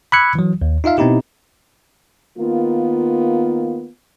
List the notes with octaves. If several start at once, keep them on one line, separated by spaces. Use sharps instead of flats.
B5 D6 E6 F#6 G#6 C#7
E3 F#3
D#2
D#4 F4 E5 F5
B2 B3 C4 D#4 E4 G4
D#3 A#3 B3 F4